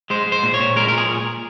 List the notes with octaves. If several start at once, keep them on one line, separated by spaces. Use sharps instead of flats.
G#3 C5
G#3
C5
A#2
C#5
A#2
G#3 A#4
A#2 A#4
G#4